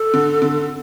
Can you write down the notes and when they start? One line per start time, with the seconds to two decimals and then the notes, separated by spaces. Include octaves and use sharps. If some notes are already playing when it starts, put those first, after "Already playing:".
Already playing: A4
0.14 D3
0.42 D3